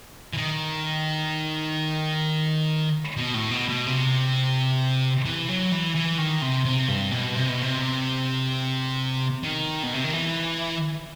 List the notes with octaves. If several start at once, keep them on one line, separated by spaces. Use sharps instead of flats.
E3
D#3
B2
A2
B2
B2
C3
E3
F#3
E3
E3
D#3
C3
C3
G2
B2
C3
B2
C3
D#3
B2
C3
D#3
E3